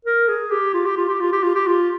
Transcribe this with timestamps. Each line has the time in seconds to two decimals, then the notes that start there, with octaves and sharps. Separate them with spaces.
0.05 A#4
0.28 G#4
0.51 G4
0.74 F4
0.86 G4
0.97 F4
1.09 G4
1.20 F4
1.32 G4
1.43 F4
1.55 G4
1.67 F4